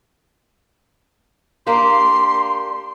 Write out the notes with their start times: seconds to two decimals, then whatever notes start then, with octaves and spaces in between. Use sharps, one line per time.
1.67 A#3 D4 G4 C6